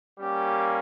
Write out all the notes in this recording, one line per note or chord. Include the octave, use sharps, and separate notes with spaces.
G3 A#3 C#4 G4